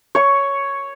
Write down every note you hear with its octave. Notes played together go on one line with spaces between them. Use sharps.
C#5 C#6